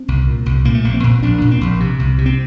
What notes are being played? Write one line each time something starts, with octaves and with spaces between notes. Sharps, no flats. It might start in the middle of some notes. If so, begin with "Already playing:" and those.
Already playing: C4
C2
A#2
C2
A#2 A#3
A3
A#1 A#3
C4
A#2
A#1 D4
A#2
C4
A#1
C3
C2
C3
C4